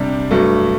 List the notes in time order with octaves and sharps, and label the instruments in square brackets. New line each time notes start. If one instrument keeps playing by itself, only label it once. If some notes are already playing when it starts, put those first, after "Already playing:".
Already playing: [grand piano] C3 G3 D4 G4
G2 F#3 A3